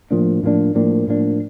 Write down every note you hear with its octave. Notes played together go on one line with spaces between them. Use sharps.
A2 F3 A#3 D4
A2 F3 A#3 D4
A2 F3 A#3 D4
A2 F3 A#3 D4